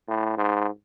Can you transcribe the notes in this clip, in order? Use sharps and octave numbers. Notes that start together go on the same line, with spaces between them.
A2
G#2